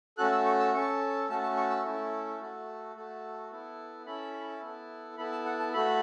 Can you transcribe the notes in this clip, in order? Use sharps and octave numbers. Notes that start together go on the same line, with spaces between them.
A3 C#4 F#4 A4 F#6
E6
C#6
E6
C#4 A4 C#6
A3 C#4 F#4 A4 A5
A5
C#6
E6
A3 C#4 E4 A4
A3 F#4 A4
A3 F#4 A4
B3 E4 A4
C#4 E4 A4 B5
B3 E4 A4
B3 E4 A4 B5
A5
F#5
A5
A3 F#4 A4 B5